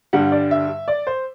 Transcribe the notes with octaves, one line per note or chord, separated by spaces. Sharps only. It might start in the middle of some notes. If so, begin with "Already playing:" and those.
G2 D3 G3 F#5
D5
E5
D5
C5